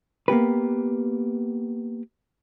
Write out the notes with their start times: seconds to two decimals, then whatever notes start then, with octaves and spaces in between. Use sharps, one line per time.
0.28 A#3 B3 G4 B4